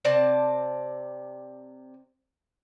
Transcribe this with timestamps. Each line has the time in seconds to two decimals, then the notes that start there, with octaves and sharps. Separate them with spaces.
0.05 C3 C4 D5 A5